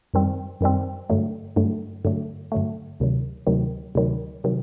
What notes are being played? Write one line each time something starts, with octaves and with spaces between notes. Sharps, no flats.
F#2 D#3 G3 C4
F#2 D#3 G3 C4
G2 D3 F#3 A3
G2 D3 F#3 A3
G2 D3 F#3 A3
G2 D3 F#3 A3
D2 C3 D#3 F#3
D2 C3 D#3 F#3
D2 C3 D#3 F#3
C3 D#3 F#3